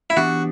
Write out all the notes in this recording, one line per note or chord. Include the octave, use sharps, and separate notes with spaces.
E4
E3 B3 D4 F#4 G4